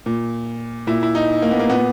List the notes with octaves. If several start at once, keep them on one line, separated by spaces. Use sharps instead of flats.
A#2
A#2 E4
E4
D#4
A#3
B3
A#3
A#2 B3